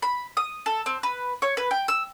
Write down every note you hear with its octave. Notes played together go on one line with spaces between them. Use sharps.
B5
D#6
A4
C4
B4
C#5
B4
G5
E6